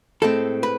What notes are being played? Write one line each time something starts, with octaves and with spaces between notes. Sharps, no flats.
A2 G#3 C4 A4
B4